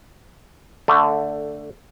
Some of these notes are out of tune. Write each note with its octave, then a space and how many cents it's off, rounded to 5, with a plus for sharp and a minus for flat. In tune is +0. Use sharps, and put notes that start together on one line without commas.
D3 +0 A3 +15